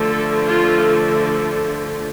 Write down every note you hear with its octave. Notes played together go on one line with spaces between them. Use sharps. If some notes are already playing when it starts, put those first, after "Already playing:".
Already playing: D3 F3 A3
A4
F4